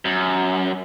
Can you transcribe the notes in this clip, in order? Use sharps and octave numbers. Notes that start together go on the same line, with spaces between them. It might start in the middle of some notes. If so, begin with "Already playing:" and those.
F#2